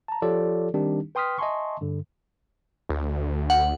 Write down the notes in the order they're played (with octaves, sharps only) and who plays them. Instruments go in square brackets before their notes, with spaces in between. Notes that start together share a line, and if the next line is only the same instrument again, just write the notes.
[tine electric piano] A5 A#5
F3 F4 G4 A4 C#5 D5
D#3 G3 C4 D4 D#4 G4
B4 G5 C6 D#6 F6 B6
D#5 E5 G#5 A5 C6 C#6
G2 D3
[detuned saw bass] D2
[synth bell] F#5